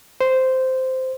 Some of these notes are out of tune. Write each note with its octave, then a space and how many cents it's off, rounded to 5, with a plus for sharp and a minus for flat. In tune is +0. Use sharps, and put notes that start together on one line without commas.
C5 -10